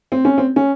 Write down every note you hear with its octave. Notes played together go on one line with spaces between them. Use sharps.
C4
C#4
C4
C#4